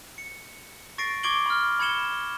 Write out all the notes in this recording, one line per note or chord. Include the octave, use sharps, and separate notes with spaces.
C#7
C#6 A6 A#6 C7 D7
C#6 D6 G#6 D7 F#7 G7
B5 F6
B5 G#6 C#7 E7 G7